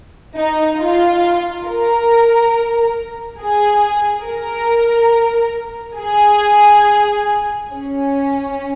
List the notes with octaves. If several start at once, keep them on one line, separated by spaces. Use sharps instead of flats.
D#4
F4
A#4
G#4
A#4
G#4
C#4